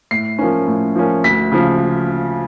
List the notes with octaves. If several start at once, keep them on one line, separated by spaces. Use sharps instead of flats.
A2 C7
F3 A#3 C#4
A2
F3 A#3 C#4
D2 B6
C#3 F3